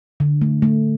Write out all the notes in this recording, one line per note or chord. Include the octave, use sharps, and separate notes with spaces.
D3
A3
A3